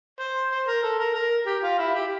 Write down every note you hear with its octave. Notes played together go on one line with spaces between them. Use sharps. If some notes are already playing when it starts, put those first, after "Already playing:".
C5
C5
A#4
A4
A#4
A#4
G4
F4
E4
G4